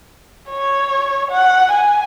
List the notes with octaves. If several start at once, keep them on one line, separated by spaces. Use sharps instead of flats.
C#5
F#5
G#5